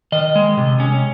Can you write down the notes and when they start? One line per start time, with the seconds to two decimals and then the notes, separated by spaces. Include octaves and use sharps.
0.12 D#3 D#5
0.35 G#3
0.57 C3
0.80 C#4